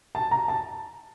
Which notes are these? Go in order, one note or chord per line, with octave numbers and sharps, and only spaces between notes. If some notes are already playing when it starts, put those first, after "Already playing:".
A5
A#5
A5